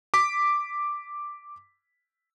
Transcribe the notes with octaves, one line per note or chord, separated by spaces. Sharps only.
D6 B6